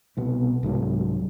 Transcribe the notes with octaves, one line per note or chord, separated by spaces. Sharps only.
C2 B2 B3
C2 G#2 F#3 G#3